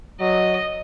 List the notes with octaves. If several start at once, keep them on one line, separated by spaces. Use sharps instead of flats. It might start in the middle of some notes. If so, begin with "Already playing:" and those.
F#3 D#5